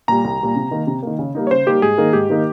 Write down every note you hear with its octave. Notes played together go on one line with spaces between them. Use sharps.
A#2 G3 A#5
C2
A#2 G3
C3
D#3 A#3
C3
D#3 A#3
C#3
G3 A#3 D#4
C#5
C#3 C5
G3 A#3 D#4 G4
G#2 G#4
D#3 A#3 D#4 A#4
G#2 G4
D#3 A#3 D#4 A#4